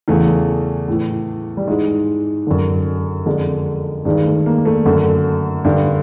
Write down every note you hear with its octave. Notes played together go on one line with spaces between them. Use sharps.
E2 C#3 E3 A3
A2 E3
G3
G#2 E3 G#3
F#2 D3
F2 D3 G#3
G2 D#3 G#3
A3
A#3
A3
F#2 D3 A3
G2 D3